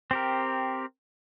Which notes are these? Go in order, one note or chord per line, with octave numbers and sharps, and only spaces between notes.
C4 G4 A#4